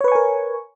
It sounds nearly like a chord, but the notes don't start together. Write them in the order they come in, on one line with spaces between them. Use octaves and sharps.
C#5 B4 C#6 G#5 A#4